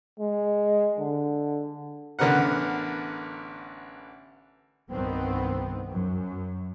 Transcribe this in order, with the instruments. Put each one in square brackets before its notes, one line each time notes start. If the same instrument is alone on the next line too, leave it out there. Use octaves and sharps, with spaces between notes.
[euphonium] G#3
D3
[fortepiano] A1 D3 B3 A#4 F#5
[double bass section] C2 G2 D#3 B3 C4
F#2